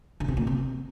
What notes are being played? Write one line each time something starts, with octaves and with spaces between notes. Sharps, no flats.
D3
C3
A#2
C3